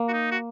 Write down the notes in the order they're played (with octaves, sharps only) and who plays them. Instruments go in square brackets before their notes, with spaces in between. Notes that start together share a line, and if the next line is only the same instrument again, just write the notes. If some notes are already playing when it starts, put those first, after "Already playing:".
Already playing: [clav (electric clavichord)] A#3
[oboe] F#4
D#4
F#4